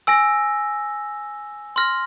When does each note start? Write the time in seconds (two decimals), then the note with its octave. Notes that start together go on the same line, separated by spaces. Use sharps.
0.07 G#5 E6 A#6
1.76 C6 F6 A#6